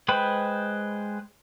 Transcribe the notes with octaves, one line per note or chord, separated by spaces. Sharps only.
G#3 B4 C5 G5 B5